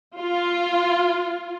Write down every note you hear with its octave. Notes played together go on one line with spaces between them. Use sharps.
F4